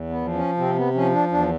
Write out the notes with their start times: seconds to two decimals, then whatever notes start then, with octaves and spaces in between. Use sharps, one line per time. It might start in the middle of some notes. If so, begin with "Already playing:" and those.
Already playing: E2
0.10 B3
0.21 F3
0.34 C#4
0.57 C3 C4
0.76 B3
0.94 F3 C#4
1.12 D4
1.31 E2 D4